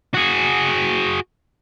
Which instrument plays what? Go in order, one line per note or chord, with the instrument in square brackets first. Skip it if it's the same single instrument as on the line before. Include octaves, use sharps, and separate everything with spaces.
[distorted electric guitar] F#4 G#4